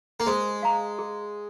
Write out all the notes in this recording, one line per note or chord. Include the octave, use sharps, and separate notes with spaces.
A#3
G#3 C5
F5 A#5
G#4